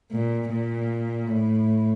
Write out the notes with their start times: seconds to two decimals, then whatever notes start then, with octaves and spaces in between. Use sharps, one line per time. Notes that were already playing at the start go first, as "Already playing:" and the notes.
0.12 A#2
0.50 A#2
1.27 A2